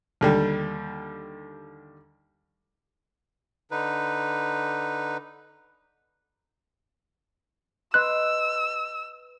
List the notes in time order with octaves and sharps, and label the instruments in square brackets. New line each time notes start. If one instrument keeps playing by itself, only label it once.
[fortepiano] D#2 D3 G3
[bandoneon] D3 D#4 B4
[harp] B4 D#5 C6 [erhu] E6 [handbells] F#6